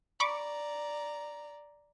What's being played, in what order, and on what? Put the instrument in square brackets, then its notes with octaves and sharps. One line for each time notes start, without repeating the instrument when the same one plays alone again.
[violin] D5 A#5 [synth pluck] B5 C#6 D6